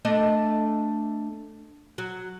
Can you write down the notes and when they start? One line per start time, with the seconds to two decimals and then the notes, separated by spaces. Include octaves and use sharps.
0.05 A3 D4 D#5
1.98 F#3